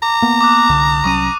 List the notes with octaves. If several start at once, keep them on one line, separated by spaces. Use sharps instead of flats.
A#5 D6
A#3 B3
D6 D#6 F#6
C2 D3
C2 F#3 C#4 C#6 D#6 D#7